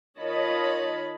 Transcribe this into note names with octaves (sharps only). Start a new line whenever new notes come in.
D#3 F4 C#5 D#5 A5 B5